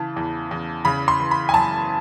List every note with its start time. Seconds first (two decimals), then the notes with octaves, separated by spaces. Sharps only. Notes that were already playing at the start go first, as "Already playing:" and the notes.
Already playing: C#3 E3 A5
0.16 E2
0.51 E2
0.85 C#3 B5
1.08 C6
1.20 E3
1.31 B5
1.49 G#5
1.54 F#2 A5